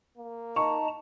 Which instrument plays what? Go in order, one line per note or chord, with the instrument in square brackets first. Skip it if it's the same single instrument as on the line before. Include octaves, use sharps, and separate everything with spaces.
[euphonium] A#3
[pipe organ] D#4 A5 A#5 [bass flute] D#5 [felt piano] C#6